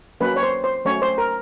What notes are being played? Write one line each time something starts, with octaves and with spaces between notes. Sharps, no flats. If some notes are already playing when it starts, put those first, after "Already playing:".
F#3 A#3 C#4 B4
C#5
C5
C5
F#3 A3 C#4 C#5
C5
A#4